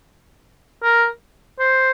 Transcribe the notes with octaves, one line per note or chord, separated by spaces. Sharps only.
A#4
C5